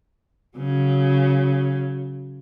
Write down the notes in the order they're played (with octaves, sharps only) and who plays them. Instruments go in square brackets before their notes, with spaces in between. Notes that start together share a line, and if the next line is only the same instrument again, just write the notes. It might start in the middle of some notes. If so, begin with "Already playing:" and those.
[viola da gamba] C#3 F#3